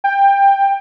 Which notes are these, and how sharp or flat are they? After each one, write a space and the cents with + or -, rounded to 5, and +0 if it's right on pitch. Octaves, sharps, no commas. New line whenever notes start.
G5 +20